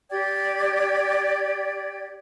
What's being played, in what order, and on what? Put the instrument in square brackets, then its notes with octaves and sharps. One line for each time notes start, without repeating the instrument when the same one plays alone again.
[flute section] G4 D5 G5 G#6